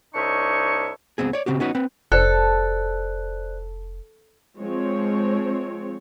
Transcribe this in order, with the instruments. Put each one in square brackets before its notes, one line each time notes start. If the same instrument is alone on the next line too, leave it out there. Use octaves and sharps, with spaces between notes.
[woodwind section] C2 D4 D#4 C#5 E5 C#6
[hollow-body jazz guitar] C#2 F#2 B3 C4 G#4
C#5 D5
C#3 C4 F#4 G4
B3 C#4 D#4 F#4 B4
C4 B4
[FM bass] F1 [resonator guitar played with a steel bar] A4 [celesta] C5 D5 F#6
[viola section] F3 G#3 C4 C#5